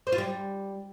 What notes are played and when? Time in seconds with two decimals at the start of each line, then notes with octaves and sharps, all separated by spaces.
0.07 C5
0.12 F4
0.18 G3